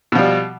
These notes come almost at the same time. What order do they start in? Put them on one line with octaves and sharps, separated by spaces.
B2 F3 G3